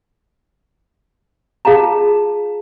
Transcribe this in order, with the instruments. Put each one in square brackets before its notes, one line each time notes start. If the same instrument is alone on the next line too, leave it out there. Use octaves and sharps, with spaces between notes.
[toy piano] F4 G#4 F5 A5 A#5